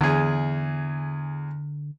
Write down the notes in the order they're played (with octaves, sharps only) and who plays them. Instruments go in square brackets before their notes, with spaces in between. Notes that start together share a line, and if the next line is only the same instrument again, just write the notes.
[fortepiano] E2 G#4 [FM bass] D3